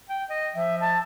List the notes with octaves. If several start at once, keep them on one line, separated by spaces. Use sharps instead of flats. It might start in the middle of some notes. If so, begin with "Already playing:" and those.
G5
D#5
F3 E5
A5